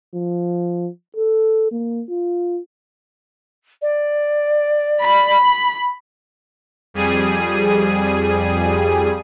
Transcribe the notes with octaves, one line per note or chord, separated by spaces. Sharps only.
F3
A4
A#3
F4
D5
B5
F2 G3 G#4 D#7